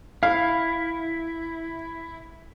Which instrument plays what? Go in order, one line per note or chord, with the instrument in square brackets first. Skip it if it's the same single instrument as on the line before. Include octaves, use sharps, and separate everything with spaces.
[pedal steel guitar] E4 [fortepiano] F5